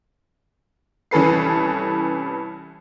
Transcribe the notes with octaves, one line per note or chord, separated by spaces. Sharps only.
C2 E3 C#4 A4 B4 C7